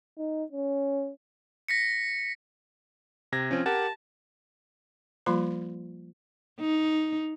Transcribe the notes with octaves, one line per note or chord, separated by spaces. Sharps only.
D#4
C#4
A#6 B6 C#7
C3 G#6 A#6
F3 C4 C#4
G4 A#4 F#5 A5
F3 G3 A#3 F4 C6
D#4